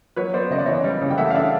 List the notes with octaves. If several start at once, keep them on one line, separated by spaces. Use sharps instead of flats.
F#3 B4 C#5
B3 C5 D5
C#3 D#5
D5
E3 C#5 D#5
G3
C#3
G5
A3 E5 F#5
F5
D4 D5 E5